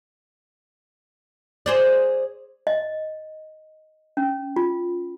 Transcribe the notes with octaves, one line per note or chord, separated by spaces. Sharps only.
G#4 C5 D5
D#5
C#4
F4